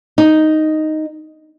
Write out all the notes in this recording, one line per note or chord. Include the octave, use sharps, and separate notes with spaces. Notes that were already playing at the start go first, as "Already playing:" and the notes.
D#4